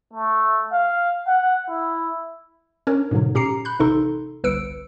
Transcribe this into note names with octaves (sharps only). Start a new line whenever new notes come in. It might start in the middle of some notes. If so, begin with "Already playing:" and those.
A3
F5
F#5
E4
C#4 D4 A#4 C#5
G#2 B2 D3 F#3
A#2 C#4 G4 A#5 C7 C#7
B5 F#6 G6
A1 C3 D#4 A4 C6
G1 C2 B4 E6 C#7 D7